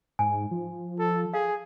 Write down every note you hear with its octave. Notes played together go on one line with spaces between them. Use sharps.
G#2 G#5
F3
A4
G#4 F5